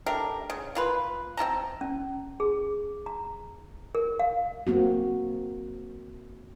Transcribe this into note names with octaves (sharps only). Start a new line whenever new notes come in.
A3 D4 G4 A#4
C#3
A#3 F4 B4
C4 F4 A5 A#5
C#4
G#4
A#5
A#4
F5
A#3 C4 F#4